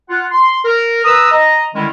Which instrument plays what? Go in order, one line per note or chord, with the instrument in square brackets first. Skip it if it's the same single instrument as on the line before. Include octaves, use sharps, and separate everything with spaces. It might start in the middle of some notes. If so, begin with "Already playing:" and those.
[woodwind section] F4 F#5
C6
A#4
B4 A#5 D#6 E6
D#5 A#5
D3 D#3 G3 G#3 C#4 E4